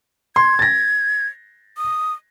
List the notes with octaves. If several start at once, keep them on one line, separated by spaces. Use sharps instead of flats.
C6 G#6
A6 A#6
D#6